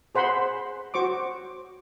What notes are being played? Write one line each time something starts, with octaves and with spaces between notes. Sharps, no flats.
G#4 C5 F#5 B5 C6
F#4 C5 C#6 D6